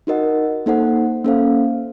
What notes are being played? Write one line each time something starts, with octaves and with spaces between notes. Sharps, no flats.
D#4 F#4 A#4 D#5 F#5
A#3 D#4 A4 C5 F#5
A#3 C#4 A4 C5 F5